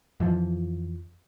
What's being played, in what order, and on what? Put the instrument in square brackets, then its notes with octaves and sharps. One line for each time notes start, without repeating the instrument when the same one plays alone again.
[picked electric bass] F2 E3 F3